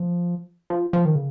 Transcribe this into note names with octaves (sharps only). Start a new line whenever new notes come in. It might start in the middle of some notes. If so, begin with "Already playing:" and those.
Already playing: F3
F3
F3
D#3
C#3